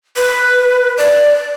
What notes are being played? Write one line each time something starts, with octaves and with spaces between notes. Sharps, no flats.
B4
D5